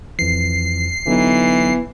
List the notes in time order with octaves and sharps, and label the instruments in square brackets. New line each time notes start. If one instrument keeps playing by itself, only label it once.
[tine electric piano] F2 E3 [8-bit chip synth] C7
[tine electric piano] D3 F#3 D#4 [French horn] E3 [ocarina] B3